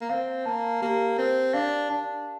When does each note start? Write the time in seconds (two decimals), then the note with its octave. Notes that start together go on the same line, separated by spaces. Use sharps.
0.01 A#3
0.09 C4 F5
0.46 A#3 A5
0.82 A#3 G4
1.18 C4 A#4
1.54 D4 F5
1.90 D4 A5